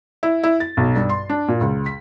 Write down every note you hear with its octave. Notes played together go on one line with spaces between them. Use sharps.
E4
E4
A6
B1
G2
C6
D4
A#2
C#2
B6